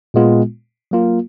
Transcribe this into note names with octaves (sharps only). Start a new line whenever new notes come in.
A#2 G#3 B3 F4
F#3 A#3 F4